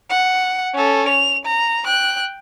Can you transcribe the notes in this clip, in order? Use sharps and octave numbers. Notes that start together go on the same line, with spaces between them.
F#5
C#4 A4
F7
A#5
G5 F#6